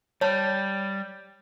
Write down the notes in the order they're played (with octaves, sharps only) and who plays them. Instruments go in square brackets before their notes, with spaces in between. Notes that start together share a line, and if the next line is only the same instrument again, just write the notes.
[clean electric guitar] G3 [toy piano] C#5 A5